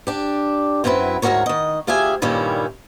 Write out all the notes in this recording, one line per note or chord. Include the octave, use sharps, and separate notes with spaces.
D4 G4
F#2 F#3 C4 E4 B4
D2 G#2 C3 F#4 A#4 C#5
D#3 D#5
D2 F4 G4 G#4 E5 G#5
G2 A#2 D#3 G3 C#4 E4